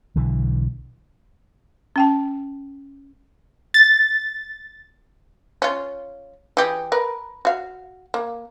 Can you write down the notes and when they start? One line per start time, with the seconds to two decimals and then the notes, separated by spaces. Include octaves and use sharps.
0.15 B1 D3 E3
1.96 C#4 G5 A5
3.74 A6
5.62 C#4 F4
6.57 E3 G4 G#4
6.92 A#4 B4
7.45 F#4 F5
8.14 A#3